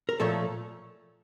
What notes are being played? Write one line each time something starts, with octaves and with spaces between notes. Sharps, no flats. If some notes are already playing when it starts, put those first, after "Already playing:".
A#4
A#2 F3 A3 A4 C#5